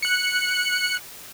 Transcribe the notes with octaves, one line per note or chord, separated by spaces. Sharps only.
F#6 C#7